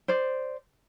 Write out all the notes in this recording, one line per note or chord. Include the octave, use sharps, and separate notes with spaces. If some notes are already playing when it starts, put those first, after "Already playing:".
C5 D5